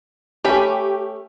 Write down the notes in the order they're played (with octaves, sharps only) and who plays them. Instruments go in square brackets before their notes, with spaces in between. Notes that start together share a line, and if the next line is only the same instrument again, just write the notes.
[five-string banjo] A3 C#4 B5 [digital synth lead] G4